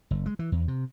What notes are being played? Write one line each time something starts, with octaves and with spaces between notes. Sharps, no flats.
F#1
G#3
E3
E2
C3